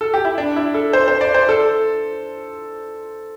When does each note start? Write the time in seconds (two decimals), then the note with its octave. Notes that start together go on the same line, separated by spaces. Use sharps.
0.01 A4
0.14 G4
0.25 E4
0.38 D4
0.56 E4
0.74 A4
0.93 C5
1.08 C5
1.21 D5
1.34 C5
1.49 A4